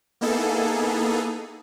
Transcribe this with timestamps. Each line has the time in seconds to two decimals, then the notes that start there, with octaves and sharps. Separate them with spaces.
0.21 A#3 B3 D#4 E4 G#4 A4